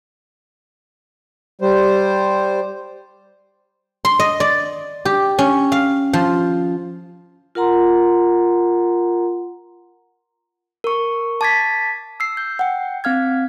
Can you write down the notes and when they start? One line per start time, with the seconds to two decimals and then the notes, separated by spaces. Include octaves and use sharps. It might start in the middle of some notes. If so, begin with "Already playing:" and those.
1.61 G3 C5
4.05 C6
4.20 D#5
4.40 D5
5.05 G4
5.39 C#4
5.72 F5
6.13 F3
7.55 F4 A#4 F#5 A#5 C6
10.84 A#4 C#6
11.41 A5 D6 G#6 A6 B6
12.20 E6 C7
12.37 G6
12.59 F#5 G5
13.04 C4 F5 F6 G#6